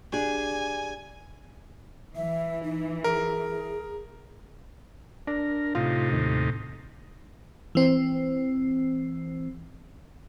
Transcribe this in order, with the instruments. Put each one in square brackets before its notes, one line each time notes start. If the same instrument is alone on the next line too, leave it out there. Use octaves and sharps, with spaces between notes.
[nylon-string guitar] D4 G4 G#4 [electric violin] G#5
[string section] E3 [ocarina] E5
[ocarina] D#4
[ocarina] G#4 [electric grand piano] A#4
[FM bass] D4 [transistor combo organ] A#4
[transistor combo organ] A2 C3 D#4 [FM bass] F4
[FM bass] D#2
[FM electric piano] E3 C4